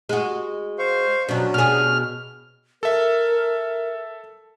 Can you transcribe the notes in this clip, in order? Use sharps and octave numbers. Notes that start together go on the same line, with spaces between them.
G#3 F#4
C5 F5 C#6
B2 F#3 C#4 D4 F#4
B2 G#4 F6
A4 A#4 E5